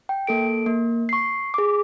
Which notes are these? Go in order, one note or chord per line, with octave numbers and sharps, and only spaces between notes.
G5
A#3 A4 D7
A#3
C#6 C7
G#4 D6